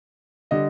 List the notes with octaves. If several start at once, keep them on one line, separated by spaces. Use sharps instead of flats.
D3 G3 D#5